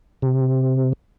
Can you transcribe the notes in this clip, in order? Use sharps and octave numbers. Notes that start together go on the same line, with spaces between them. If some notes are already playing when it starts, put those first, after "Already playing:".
C3